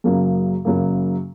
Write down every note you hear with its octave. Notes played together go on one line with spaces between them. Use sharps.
F#2 C#3 F#3 A#3
F#2 C#3 F#3 A#3